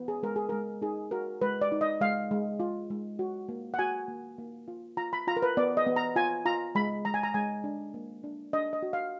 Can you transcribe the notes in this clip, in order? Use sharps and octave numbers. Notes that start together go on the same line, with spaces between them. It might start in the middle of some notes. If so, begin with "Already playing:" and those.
Already playing: B3
G#4
G#3 A#4
G#4
G#3 A#4
D#4 G#4
F#4 A#4
G#3 B4
D5
D#4
D#5
G#3 F5
G#3
F4
G#3
F#4
A#3
F#5
F#4 G#5
A#3
A#3
F4
F4 A#5
B5
F4 A#5
A#4
B4
B3 D5
D#5
B3
A#5
F4 G#5
F4 A#5
G#3 B5
G#3 A#5
G#5
A#5
G#3 G#5
D4
A#3
D4
D4 D#5
D#5
F#4
F5